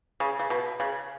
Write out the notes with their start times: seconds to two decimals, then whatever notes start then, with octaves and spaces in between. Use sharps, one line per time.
0.20 C#3
0.39 C#3
0.50 B2
0.80 C#3